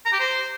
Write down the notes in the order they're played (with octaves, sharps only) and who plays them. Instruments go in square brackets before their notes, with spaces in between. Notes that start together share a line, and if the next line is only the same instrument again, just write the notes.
[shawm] A#5
G4
C5